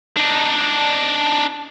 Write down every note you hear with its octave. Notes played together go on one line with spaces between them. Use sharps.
D4 D#4